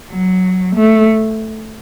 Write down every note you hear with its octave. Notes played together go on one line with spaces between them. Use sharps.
F#3
A3